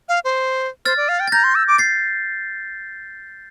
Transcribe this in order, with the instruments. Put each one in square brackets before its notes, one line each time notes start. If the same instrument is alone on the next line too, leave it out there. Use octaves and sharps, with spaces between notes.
[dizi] F5
C5
[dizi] C5 [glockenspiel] F6 A6
[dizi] D5
F5
G5
[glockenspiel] A6
[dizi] A#5 [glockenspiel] G6 A#6
[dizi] C6
E6
D6
[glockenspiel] A6 C7